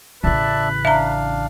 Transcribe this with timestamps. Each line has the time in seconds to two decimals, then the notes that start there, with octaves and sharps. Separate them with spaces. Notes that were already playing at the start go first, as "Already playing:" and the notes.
0.24 A1 C#3 B4 D5 E5 A5
0.85 D4 E5 F5 A#5